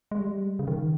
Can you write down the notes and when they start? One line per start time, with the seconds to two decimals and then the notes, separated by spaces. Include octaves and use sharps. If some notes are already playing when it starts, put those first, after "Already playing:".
0.11 G#3
0.19 G3
0.59 C#3
0.67 D#3